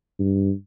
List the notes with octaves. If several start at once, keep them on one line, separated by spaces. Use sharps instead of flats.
G2